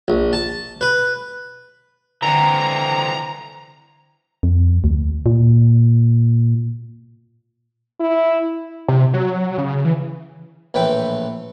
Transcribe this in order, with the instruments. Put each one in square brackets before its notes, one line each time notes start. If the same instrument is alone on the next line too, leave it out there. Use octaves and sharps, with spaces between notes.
[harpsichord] A#1
A5
B4
[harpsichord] D3 F#5 [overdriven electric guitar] E3 C4 [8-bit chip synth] A#5
[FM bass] F2
D2
A#2
[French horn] E4
[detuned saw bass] C3
F#3
C#3
E3
[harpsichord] A#1 A2 E3 B4 G5